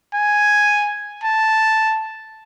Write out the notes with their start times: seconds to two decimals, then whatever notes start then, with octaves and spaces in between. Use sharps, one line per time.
0.14 G#5
1.24 A5